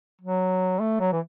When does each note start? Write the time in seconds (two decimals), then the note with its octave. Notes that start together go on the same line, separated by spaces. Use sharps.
0.21 F#3
0.79 A3
1.00 F#3
1.12 E3